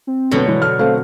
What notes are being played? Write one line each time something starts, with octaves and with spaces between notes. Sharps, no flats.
C4
B2 D3 F#3 A3 B3
E3 G#3
A4 F6
A3 C4 F5